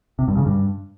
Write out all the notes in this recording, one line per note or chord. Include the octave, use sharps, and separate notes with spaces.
C3
G2
C#3
G2